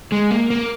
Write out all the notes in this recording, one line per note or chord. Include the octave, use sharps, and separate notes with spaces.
G#3
A#3
A#3